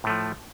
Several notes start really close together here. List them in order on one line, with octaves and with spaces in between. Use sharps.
A2 A3 F3